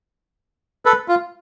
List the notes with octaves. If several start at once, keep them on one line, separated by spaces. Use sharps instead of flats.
A4 B4
F4